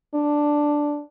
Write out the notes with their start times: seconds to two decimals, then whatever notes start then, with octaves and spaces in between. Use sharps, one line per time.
0.15 D4